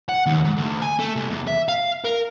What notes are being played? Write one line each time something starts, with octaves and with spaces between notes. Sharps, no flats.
F#5
D#2
G#2
D2
G#5
A3
C2
E2
E5
F5
A#4